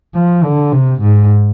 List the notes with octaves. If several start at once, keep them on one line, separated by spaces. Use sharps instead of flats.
F3
D3
C3
G#2